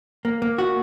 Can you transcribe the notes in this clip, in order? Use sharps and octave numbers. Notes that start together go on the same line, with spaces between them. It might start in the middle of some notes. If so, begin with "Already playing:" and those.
A#3
A#3
F#4